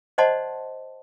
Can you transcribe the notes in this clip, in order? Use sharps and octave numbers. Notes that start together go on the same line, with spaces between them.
C5 D5 D#5 F#5 A5 C6